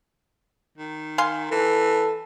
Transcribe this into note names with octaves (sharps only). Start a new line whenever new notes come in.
D#3
F5 G#5 C6
E3 A4